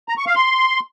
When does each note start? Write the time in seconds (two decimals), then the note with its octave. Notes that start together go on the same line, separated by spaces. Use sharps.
0.09 A#5
0.18 C#6
0.27 F5
0.35 C6